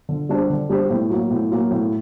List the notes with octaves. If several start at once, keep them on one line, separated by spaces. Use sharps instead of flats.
D3
G3 D4 G4 C5
D3
G3 D4 G4 C5
A2
F#3 A#3
A2
F#3 A#3
A2